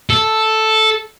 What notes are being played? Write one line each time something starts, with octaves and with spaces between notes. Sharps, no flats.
A4